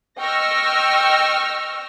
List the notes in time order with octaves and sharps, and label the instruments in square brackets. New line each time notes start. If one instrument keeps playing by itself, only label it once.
[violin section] D#5 G5 C#6 E6 F6 A#6